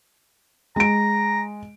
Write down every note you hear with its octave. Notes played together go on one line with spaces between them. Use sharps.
G#3 A#5 D7